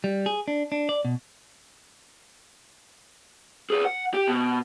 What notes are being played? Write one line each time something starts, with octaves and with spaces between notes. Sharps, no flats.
G3
G#4
D4
D4
D5
B2
G#4 B4
F#5
G4
B2